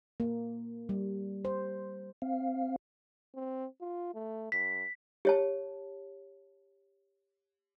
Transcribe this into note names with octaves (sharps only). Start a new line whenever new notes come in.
A#3
G3
C5
C4 F5
C4
F4
A3
F#2 B6
G4 C#5 A5